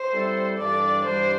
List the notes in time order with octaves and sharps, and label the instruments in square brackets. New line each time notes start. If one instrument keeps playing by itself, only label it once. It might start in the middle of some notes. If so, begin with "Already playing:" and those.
Already playing: [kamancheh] C5
[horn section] G3 C4 E4 A4
[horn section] G2 E3 G3 D4 A4 [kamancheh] D5
[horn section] G2 E3 G3 D4 [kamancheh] C5